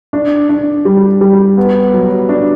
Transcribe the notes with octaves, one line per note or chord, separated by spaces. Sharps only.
D4
D4
G3
G3
B3
F#3
D4